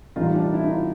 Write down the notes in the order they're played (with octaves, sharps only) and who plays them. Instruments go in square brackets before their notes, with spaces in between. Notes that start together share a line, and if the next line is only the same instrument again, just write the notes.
[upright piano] A2 E3 G3 D#4 F4
D4
D#4
E4
D#4 F4